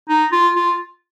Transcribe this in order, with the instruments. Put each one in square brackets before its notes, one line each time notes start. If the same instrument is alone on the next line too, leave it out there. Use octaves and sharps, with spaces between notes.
[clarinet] D#4
F4
F4